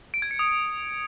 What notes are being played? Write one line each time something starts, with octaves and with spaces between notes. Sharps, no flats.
D7
G#6
C#7
D#6